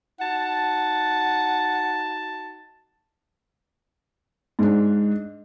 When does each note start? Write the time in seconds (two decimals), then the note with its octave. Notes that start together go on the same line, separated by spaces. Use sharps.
0.20 D#4 F#4 F#5 A5
4.59 G#2 D4